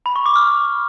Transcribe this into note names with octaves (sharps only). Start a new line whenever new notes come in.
B5
C#6
D6
F6